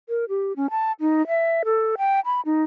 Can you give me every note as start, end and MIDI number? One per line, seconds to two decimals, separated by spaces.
0.09 0.25 70
0.29 0.53 67
0.56 0.70 61
0.70 0.92 81
1.00 1.26 63
1.27 1.63 76
1.65 1.95 69
1.98 2.20 79
2.25 2.41 83
2.45 2.64 63